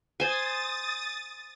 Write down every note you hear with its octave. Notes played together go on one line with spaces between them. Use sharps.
C5 G#5 D#6 A6